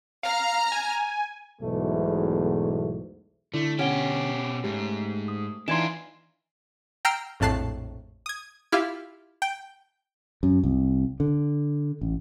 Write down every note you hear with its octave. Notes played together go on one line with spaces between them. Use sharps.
F5 A#5 F6
G#5
B1 E2 G#2 B2 A3
D3 A3 E4
B2 C#4 G4 C#5 F#5 G7
G#2 A3 G4
D#6
E3 D4 D#4 F4 A#5 C6 G#6 E7
G5 A#5 E6 F6 C7 D7
A#1 F2 A2 A5 F#6 C7
D#6 G#6
E4 F4 G4 F5
G5
F#2
C2
D3
A1